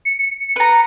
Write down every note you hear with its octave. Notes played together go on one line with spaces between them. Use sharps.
C#7
B4 A#5